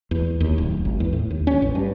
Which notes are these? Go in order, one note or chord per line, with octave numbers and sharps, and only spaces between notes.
E2
D#2
D1
G#1
E2
A2
D#2
C#4
A1
G2